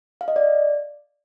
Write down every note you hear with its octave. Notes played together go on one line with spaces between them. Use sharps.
F5
D#5
D5